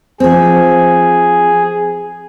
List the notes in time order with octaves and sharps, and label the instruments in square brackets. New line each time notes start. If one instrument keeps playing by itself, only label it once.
[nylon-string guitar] F3 C4 [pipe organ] G#4